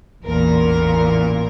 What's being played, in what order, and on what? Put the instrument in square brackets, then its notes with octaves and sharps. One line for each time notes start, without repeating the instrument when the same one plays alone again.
[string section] A1 E2 A#2 A#4